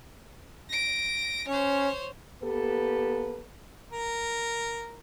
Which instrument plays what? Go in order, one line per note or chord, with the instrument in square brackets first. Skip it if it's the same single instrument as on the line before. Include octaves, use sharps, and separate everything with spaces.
[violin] A#6 D7
[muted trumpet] C#4 [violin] C5 C#5
[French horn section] A#3 B3 G4 A4 B4
[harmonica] A#4